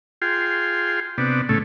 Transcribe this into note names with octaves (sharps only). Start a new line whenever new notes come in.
F4 G#4 G5 C6
C3 B3 D4
A2 C#3 A3